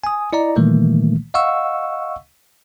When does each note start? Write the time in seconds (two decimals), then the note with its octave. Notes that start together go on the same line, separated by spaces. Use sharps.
0.04 G#5 D#6
0.33 E4 D5 D#5 A#5
0.56 A#2 D#3 E3 G3 A3 A#3
1.34 D#5 F5 F#5 C#6 E6